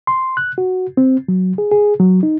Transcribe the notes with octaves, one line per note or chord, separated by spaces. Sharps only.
C6
F#6
F#4
C4
F#3
G#4
G#4
F#3
D#4